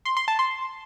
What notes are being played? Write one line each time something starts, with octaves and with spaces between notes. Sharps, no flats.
C6
C6
A5
C6